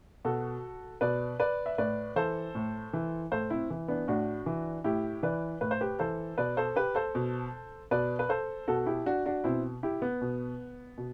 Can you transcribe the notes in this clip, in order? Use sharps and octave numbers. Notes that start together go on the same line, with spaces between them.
B2 F#4 A4
B2 B4 D5
B4 D5
E5
A2 B4 D5
E3 A4 C5
A2
E3
A2 A4 C5
C4 E4
E3
B3 D4
A2 D4 F#4
E3
A2 E4 G4
E3 B4 D5
A2 B4
C5
G4 B4
E3 A4 C5
B2 B4 D5
A4 C5
G4 B4
A4 C5
B2
B2 B4 D5
B4
A4 C5
B2 F#4 A4
E4 G4
D4 F#4
D4 F#4
B2 C4 E4
E4 G4
B3
B2
B2